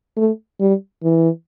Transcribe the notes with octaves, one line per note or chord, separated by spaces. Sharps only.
A3
G3
E3